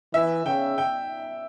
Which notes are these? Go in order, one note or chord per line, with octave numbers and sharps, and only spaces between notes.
E3 E5
C#3 G5
G5